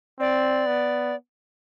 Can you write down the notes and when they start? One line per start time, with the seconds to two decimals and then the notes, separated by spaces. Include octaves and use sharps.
0.19 C4 D5
0.67 B3